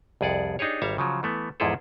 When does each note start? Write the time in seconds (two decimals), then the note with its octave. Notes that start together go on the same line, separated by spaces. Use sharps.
0.21 C2 F2 G#4 D5 F#5
0.59 D4 D#4 G4 G#4 C#5
0.82 G#1 G3 C#5 E5 F5 A#5
0.98 C#3 F3 F#3
1.23 E3 A3 B3
1.60 E2 G#2 F3 E4 G#4 A4